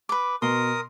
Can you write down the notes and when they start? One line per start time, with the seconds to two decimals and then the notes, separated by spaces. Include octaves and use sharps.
0.09 B4 D6
0.42 B2 A#4 C6 D#6